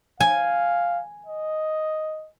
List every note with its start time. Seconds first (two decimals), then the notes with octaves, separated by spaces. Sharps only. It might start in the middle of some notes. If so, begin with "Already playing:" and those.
0.20 F5 G#5
1.27 D#5